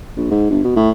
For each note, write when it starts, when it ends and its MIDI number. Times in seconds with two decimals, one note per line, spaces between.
0.17 0.30 34
0.31 0.50 44
0.50 0.62 31
0.64 0.73 47
0.76 0.90 45